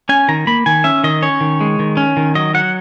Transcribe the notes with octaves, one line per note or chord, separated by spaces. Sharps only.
C#4 G#5
D#3 A#5
A#3 B5
D#3 G#5
C#4 E5
D#3 D#5
C#4 C#5
D#3
G#3
D#3
C#4
D#3
F#3 D#5
F#3 F#5